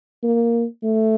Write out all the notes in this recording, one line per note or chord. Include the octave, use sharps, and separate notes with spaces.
A#3
A3